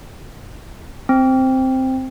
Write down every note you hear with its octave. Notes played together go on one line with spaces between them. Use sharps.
C4